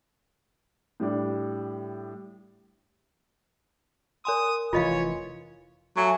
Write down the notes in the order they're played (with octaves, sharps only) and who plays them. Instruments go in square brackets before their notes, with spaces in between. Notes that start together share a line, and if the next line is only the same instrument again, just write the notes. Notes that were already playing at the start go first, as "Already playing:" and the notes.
[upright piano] A2 G3 D4
[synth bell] A#4 G#5 C6 [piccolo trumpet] D#6
[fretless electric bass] F1 E3 [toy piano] F4 D#5 F5 [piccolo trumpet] C#5
[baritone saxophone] F#3 [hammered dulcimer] A3 G#5 C#6